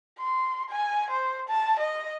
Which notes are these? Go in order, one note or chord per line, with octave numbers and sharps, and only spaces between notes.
C6
G#5
C5
A5
D#5